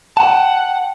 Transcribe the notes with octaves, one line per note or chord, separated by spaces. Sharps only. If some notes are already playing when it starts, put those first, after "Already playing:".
F#5 G5 A5